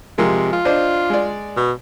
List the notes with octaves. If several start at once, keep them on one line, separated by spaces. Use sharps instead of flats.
C3 F3 G#3 A#4
F4
D4 C5 D#5
G#3 D5
B2